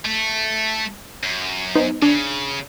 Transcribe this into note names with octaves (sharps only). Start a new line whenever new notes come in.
A3
F#2
B3 D#4 C5
C#3 D4